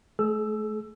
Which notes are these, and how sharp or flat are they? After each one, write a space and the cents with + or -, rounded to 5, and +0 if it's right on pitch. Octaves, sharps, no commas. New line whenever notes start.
A3 -30 G#4 +45 E6 +10